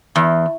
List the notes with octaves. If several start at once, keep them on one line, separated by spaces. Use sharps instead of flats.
E2